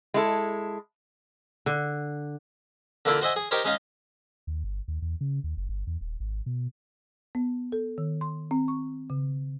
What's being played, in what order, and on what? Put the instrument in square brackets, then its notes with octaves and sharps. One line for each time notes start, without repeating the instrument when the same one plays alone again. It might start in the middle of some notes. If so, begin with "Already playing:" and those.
[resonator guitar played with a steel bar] G#3 E4 A4
[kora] D3
[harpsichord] D3 A#3 D4 E4 F4
F#4 C5 D#5 E5 G#5
G#4
D#4 G4 A#4 C5 C#5
G#3 C#4 D#4 D#5 F5
[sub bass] D#2
G1
D#2
E2
C#3
D#2
F#1
G1
E2
D#1
G#1
B2
[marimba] B3
A4
D#3
C6
C4
C#6
C#3